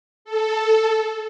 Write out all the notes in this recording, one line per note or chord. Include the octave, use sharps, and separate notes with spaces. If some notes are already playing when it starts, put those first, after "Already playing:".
A4